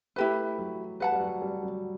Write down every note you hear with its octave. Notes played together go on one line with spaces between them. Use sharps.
A3 E4 G4 B4
F#3
G3 B4 F#5 A5
G3
F#3
G3
F#3